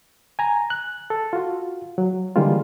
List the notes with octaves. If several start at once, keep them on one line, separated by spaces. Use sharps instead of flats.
G#5 A#5
F#6
A4
F4 F#4
F#3
D3 E3 G3 G#3 A#3 F4